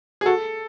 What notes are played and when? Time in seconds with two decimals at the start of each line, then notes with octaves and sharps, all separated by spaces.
0.21 G#4
0.25 F#4 A4